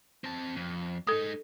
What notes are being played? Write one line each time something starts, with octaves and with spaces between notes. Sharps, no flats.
C4 A5
F2
G#3 D#4 A4 D#6